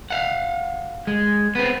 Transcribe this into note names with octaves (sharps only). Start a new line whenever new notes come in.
F5 F#5
G#3
B3 C4